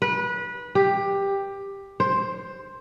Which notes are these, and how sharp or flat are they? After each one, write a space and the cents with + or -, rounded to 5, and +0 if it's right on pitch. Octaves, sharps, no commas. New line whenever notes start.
B4 -25
G4 +10
C5 +10